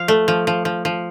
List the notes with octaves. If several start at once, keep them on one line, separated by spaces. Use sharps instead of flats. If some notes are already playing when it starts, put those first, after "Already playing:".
Already playing: F3 F5
A3
F3
F3
F3
F3